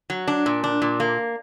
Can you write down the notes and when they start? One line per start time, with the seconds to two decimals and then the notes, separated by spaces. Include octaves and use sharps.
0.10 F#3
0.28 D4
0.46 A#2
0.64 D4
0.82 A#2
1.00 A#3